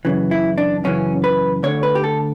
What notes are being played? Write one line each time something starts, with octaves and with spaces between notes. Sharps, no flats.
F#2 C#3 E3
E4
D4
F#2 C#3 E3 C#4
B4
D2 D3 C#5
B4
G4
A4